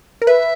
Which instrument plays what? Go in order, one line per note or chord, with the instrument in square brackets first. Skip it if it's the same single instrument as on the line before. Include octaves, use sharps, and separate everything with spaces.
[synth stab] A#4
[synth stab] B4 [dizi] E5